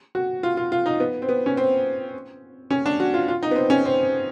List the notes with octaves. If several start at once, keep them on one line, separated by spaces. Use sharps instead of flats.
F#4
F4
F4
F4
D#4
B3
C4
B3
C#4
C4
C#4
D4
F#4
F4
F4
D#4
B3
C4
C#4
C4